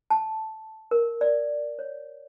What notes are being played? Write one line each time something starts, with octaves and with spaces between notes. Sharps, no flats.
A5
A#4
D5
C#5